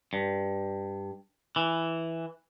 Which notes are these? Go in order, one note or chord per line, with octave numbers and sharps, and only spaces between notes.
G2
E3